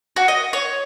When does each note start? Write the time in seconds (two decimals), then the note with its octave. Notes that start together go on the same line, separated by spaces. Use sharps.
0.16 F#4
0.28 D#5
0.53 C#5